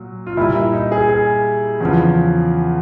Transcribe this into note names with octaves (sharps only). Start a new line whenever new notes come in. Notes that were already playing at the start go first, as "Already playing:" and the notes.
Already playing: A#2 F#3
F4
A#2 G3 E4
E4
D#4
G#4
G#4
E2 C#3 F3